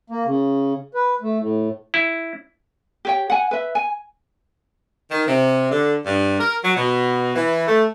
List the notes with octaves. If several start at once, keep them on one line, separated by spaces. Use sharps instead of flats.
A#3
C#3
B4
A3
A2
E4
G4 C#5 G5
F#5 G#5
B4 E5
G#5
D#3
C3
D3
G2
A#4
F#3
B2
E3
A3